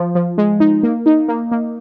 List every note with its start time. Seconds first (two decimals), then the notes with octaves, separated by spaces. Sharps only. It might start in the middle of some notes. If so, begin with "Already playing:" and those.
Already playing: F3
0.15 F3
0.38 G#3
0.60 D#4
0.83 A#3
1.06 D#4
1.28 A#3
1.52 A#3